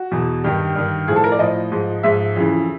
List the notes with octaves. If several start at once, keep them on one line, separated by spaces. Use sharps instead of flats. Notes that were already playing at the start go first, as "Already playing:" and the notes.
Already playing: F#4
E2 B2
G2 D#3 G4
G2 D#3
A2 F3 G#4
A4
A#4
D5
A2 F3 D#5
G#2 F3
G#2 F3 E5
F2 C#3 E3